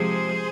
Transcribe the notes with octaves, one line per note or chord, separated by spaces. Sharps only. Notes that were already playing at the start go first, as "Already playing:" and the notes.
Already playing: C3 F3 G#3 G#4 C5